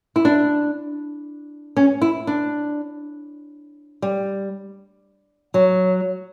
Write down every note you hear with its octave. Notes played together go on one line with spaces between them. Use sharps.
E4
D4
C#4
E4
D4
G3
F#3